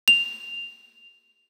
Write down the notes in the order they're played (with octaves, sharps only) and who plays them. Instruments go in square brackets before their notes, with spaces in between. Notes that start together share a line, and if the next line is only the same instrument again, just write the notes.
[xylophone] F7